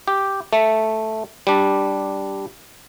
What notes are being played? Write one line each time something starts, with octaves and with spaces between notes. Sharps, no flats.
G4
A3
G3 D4